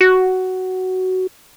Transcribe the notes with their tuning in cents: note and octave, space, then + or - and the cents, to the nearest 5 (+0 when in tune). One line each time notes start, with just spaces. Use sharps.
F#4 +10